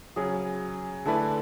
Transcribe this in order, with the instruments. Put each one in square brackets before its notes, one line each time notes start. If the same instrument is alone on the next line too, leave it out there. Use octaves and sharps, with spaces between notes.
[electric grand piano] C#3 F#3 C#4 [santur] G#4
[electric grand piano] D3 A3 E4 B4 D5 [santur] A4